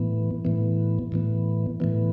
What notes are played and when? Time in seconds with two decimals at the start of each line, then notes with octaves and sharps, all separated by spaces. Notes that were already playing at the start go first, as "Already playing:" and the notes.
Already playing: A2 E3 B3
0.45 A2 E3 B3
1.12 A2 E3 B3
1.80 A2 E3 B3